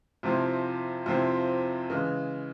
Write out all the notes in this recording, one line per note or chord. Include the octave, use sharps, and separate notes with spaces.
F2 C3 F3 C4 E4
F2 C3 F3 C4 E4
C#3 E3 G#3